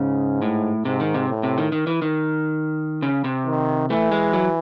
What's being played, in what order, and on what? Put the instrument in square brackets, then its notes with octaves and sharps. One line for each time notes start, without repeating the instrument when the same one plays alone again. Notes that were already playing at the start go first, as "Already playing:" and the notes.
Already playing: [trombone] G#2 [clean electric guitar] C#3
[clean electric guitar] A2
[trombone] G#2 [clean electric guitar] C3
[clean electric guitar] D#3
C3
[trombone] A2
[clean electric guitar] C3
D#3
D#3
E3
D#3
C#3
C3
[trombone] D#3
[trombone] E3 [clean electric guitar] A3
[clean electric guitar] G#3
F#3